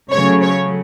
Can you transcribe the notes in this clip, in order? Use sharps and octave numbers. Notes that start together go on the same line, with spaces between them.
C#3 F#3 A3 C#5
C#5